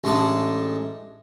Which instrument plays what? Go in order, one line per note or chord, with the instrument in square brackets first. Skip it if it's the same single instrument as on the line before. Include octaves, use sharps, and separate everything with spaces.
[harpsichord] A1 G#3 A3 D4 A5